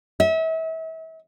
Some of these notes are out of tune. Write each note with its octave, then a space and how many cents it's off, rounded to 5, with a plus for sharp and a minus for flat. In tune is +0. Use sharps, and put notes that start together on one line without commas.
E5 -35